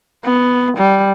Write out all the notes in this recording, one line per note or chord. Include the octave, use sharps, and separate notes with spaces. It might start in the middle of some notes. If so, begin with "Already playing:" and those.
B3
G3